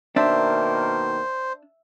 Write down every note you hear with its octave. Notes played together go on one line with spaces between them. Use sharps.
B2 D#3 A#3 D4 C5 E5